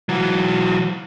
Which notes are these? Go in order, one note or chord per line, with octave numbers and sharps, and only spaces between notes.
E3 F#3